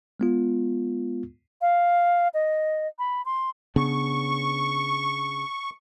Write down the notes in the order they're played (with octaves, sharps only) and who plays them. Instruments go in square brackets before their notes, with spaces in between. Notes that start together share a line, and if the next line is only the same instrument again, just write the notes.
[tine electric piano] G#3 B3 F4
[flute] F5
D#5
B5
C6
[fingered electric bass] C#3 B3 D4 [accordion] C#6